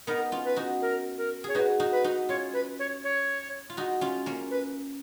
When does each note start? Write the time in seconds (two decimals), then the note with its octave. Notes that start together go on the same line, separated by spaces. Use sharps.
0.07 B3 D#4 A#4
0.32 C#4 F4
0.45 B4
0.56 D#4 F#4
0.82 A#4
1.18 A#4
1.44 G#4 C#5
1.55 D#4 F#4 B4
1.80 D#4 F#4
1.92 B4
2.04 D#4 F#4
2.29 C#4 F4 C#5
2.53 B4
2.79 C#5
3.04 C#5
3.70 F4
3.77 D#4 F#4
4.01 C#4 F4
4.26 A#3 C#4
4.50 B4